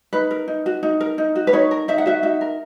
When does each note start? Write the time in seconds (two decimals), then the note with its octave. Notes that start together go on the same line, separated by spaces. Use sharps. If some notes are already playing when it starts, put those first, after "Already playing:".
0.13 D#4 B4
0.31 A#4
0.48 D#4
0.66 F#4
0.83 D#4
1.01 A#4
1.18 D#4
1.36 F#4
1.47 B4
1.53 D#4 C#5
1.71 A#4
1.88 D#4 E5
1.98 F#5
2.06 F#4 E5
2.23 D#4 E5
2.41 A#4